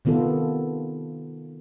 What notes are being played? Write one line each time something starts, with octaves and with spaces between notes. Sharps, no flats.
C3 D#3 B3 F4 A4